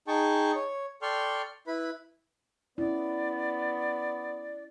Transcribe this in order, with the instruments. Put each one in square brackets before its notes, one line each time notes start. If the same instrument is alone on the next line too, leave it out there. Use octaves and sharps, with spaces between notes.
[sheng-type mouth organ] D#4 G#4 G5 A5 C#6
C#5
A4 D5 G5 C6 C#6 F6
E4 B4 B5
[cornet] B3 [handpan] C#4 E4 [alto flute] D5